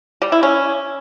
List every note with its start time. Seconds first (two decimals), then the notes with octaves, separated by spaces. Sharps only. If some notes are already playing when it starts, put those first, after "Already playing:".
0.22 G3
0.32 E4
0.43 C#4